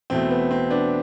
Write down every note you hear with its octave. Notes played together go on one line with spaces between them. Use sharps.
E2 B2 A3 C4
B3
C4
B3 D4